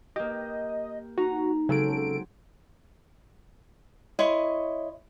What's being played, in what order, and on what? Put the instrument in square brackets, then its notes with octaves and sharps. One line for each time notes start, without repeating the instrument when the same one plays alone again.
[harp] A#3 G4 [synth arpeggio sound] D#5
[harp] D#4 A#5 [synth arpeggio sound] F#4
[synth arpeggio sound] C#3 A4 D7 [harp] F#3 G#3 C4
[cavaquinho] E4 C#5 D#5 C6